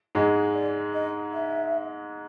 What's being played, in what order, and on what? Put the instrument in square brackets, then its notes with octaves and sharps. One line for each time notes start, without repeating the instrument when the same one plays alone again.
[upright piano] G#2 G#3
[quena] D5
D#5
E5